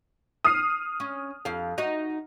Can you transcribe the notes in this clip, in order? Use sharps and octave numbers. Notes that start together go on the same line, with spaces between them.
D#6 F6 C7
C#4
F2 F5
D#4 F#4